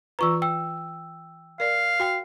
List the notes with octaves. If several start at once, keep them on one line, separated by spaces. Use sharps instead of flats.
E3 F4 B4 A#5 C#6 E6
G5 E6
A#4 D5 F5
F#4 G5 C7